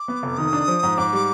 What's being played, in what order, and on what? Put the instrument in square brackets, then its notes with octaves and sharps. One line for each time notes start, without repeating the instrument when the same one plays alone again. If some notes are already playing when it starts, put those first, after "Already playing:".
Already playing: [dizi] D6
[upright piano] B3
F1
[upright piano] D#3 [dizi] D#6
[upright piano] D4
F3
G#2
[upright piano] G#2 [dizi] D6
[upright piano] G3